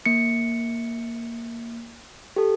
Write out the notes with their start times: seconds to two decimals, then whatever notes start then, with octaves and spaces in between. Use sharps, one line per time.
0.06 A#3 C#7
2.36 G4 A4